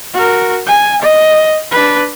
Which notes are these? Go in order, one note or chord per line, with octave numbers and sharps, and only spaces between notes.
F#4 A#4
G#5
D#5
D4 B4